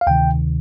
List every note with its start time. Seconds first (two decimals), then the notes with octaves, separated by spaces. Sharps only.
0.01 F5
0.07 D2 C3 D#3 G5